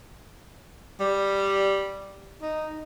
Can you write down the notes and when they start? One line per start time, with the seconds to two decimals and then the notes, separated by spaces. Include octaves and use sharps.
1.00 G3
2.41 D#4